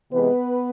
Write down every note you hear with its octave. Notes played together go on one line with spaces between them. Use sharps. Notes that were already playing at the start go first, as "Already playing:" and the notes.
C3 E3 G#3 B3 B4